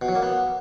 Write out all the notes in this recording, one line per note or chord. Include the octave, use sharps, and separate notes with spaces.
B2
F#3
A#3
B3